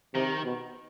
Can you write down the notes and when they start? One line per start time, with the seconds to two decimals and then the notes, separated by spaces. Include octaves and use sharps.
0.15 C3 D#3
0.44 B2